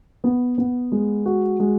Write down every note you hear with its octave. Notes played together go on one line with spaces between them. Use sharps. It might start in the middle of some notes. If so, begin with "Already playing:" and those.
B3
B3
G#3
F#4
G#3